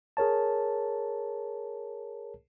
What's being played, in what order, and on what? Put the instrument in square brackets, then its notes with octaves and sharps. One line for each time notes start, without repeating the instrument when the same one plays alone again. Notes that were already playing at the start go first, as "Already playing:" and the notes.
[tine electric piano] G#4 A#4 C#5 A5